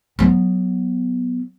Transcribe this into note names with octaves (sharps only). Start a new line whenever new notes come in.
F#3 B3